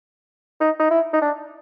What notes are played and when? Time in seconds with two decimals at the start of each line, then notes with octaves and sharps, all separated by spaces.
0.61 D#4
0.80 D#4
0.91 E4
1.13 D#4
1.22 D4